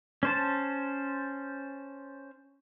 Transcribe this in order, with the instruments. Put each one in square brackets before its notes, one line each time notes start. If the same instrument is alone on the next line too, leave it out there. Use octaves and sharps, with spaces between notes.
[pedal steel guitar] C#4 C5 A5